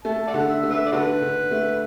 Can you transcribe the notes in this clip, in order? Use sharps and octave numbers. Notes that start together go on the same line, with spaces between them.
A3 A5
A4 D5 F#5
D3
E5
A3
B4 E5
D5
D3 D4 F#4 B4
D3
A3